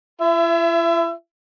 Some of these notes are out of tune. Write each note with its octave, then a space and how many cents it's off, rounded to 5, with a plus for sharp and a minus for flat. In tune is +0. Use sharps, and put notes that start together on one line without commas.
E4 +45 E5 +25